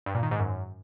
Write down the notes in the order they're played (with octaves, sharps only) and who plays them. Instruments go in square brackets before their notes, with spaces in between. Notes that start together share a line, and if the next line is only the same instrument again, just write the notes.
[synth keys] G2
A#2
D#3
G#2
F#2